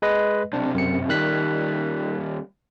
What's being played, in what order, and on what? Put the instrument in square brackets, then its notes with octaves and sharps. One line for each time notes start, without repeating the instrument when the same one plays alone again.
[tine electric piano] G#3 B4 D#5
[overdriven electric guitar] B1 C3 [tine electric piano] D4
[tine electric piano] F#2 C#7
[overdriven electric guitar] D#2 G3 [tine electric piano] D#3 F#6 B6